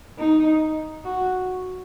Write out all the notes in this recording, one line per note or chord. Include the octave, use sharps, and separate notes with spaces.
D#4
F#4